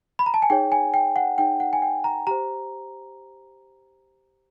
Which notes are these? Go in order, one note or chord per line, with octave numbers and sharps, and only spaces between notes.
B5
A#5
A5
G#5
D#4 G#4 C#5 G5
G#5
G5
F#5
D#4 G#4 C#5 G5
F#5
G#5
G5
A#5
G4 C5 A#5